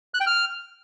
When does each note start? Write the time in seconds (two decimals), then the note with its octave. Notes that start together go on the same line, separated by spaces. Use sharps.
0.14 F#6
0.20 G5
0.27 F6